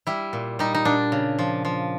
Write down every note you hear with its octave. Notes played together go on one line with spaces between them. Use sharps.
G3 E4
A#2
G3 D#4
D#4
A#2 D4
C#3
F3
F3